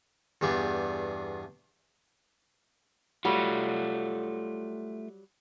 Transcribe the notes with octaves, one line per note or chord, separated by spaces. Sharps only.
E2 G2 B3 G#4 D5
F#3 G3 A3 F4 F#4